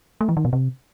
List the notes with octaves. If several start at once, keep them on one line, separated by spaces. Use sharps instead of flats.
A3
E3
D#3
B2
C3